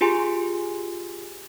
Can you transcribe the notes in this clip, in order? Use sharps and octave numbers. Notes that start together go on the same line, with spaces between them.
F4 G4 G#4 G#5 C6